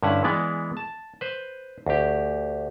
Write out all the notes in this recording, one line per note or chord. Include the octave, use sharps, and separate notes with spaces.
G2 D3 C#4 E4 F#5
E3 G#3 B3 D5
A5
B4 C5
D2 G4